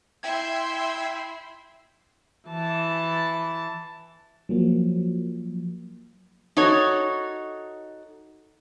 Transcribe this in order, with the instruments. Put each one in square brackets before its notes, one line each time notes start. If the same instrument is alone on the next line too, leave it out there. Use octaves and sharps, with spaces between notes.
[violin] E4 C6 [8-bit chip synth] E5 G5 G#6
[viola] E3 A5
[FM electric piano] F3 F#3 A#3
[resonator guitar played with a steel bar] D#4 F#4 A4 C#5